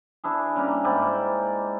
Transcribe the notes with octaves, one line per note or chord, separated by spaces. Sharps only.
D4 E4 G#4
C#3 G3 A#3
G#2 E4 D5 G5